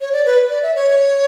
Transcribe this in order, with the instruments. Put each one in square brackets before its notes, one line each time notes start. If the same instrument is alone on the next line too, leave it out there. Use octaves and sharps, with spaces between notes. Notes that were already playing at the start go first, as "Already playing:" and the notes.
[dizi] C#5
D5
B4
D5
E5
C#5